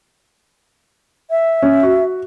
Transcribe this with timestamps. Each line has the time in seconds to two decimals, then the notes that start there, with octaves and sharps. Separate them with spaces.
1.30 E5
1.62 C#4
1.83 F#4